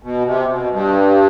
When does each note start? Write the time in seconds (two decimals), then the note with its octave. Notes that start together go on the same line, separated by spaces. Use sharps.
0.03 B2
0.25 C3
0.48 B2
0.71 G2